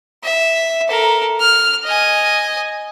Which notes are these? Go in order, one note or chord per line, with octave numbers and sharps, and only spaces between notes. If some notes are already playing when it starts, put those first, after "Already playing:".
E5
A4 A#4
F6
D#5 G#5